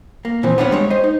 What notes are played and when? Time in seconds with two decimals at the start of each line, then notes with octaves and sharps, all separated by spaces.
0.25 A#3
0.43 A#2 E3 F3 C4
0.58 B3 C4 D4 F4 C#5 F#5
0.71 G3 G#3 C#5
0.90 C5 D#5
1.04 D#4